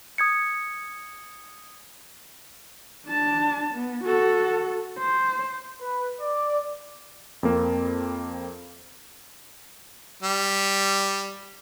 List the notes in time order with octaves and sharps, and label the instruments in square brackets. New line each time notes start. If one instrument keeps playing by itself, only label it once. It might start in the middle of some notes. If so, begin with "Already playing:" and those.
[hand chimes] D#6 G#6 C#7
[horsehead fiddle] D4 A5
B3
F#4 A4
C5
[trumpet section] B4
D5
[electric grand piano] F2 A#3 C4
[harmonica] G3